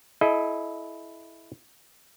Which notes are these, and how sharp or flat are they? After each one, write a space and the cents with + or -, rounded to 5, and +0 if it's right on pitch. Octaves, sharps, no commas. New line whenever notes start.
E4 +0 A4 -40 D#5 +0